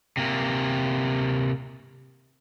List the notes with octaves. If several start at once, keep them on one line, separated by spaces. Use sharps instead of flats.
C3 A#3